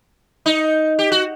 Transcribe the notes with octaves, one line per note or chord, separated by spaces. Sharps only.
D#4
G4
F#4